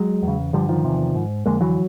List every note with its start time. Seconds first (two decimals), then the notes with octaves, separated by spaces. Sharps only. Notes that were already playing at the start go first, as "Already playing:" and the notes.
Already playing: F#3 G#3
0.22 E2
0.28 C#3
0.53 G2 D3 F3 G3
0.69 D#3 F3
0.84 E2 C3
1.15 G#2
1.46 F2 D3 G#3 A#3
1.61 E3 F#3